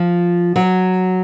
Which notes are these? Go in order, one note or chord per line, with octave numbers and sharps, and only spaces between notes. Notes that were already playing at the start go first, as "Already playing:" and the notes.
Already playing: F3
F#3